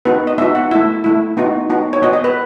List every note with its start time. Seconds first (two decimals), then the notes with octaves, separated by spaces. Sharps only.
0.05 B3 D#4 F#4 B4
0.27 D#5
0.38 B3 D#4 F#4 E5
0.55 F#5
0.71 A3 E4 E5
1.04 A3 E4
1.37 B3 D#4 F#4
1.70 B3 D#4 F#4
1.93 C#5
2.02 B3 F#4 D#5
2.13 D#5
2.24 B4